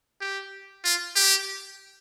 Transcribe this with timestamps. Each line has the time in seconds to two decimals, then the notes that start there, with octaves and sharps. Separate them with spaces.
0.21 G4
0.84 F4
1.16 G4